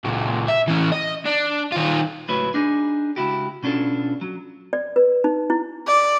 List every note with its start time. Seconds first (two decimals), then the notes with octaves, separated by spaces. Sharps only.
0.05 C#2 A#2
0.48 E5
0.68 E3 C#4
0.92 D#5
1.26 D4
1.72 D#3 F4
2.28 C#2 A2 F#3 E4 B4 C#5
2.54 D4 D#4 G#4
3.16 C#2 E4 F#4 G4
3.63 B2 C#4 D4 F4 A4
4.21 F#3
4.73 D5
4.96 B4
5.24 D#4
5.50 E4
5.87 D5